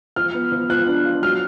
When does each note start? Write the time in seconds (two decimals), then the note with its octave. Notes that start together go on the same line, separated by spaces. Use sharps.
0.16 F3 F6
0.34 B3
0.52 F3
0.70 F3 F#6
0.87 D4
1.05 F4
1.22 F#3 F6